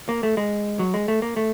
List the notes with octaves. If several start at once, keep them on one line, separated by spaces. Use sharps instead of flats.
A#3
A3
G#3
F#3
G#3
A3
A#3
A3